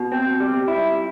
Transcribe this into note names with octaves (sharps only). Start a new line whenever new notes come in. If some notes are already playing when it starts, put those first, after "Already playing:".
Already playing: B2
C4
G3
E4